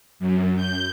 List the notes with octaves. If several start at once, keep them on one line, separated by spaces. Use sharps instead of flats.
F#2
G6